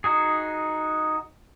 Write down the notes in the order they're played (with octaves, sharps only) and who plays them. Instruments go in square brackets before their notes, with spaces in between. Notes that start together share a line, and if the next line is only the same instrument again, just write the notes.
[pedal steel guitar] D#4 F#4 G#4